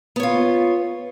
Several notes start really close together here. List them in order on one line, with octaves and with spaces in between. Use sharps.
B3 C#5 F4